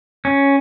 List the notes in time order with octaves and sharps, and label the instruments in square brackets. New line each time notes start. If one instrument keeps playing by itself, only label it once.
[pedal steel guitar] C#4